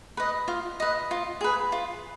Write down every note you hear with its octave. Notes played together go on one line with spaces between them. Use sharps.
B4 D#5
F4
B4 D#5
F4
G#4 B4
F4